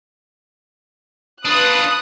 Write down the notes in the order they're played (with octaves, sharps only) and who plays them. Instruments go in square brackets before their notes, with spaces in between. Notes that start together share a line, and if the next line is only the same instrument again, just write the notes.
[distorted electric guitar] D4 F4 [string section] B4 D#6 F#6